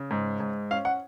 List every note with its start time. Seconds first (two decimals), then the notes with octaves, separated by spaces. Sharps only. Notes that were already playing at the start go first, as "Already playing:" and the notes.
Already playing: C#3
0.11 G#2
0.40 G#2
0.71 C#4 F5
0.85 F#5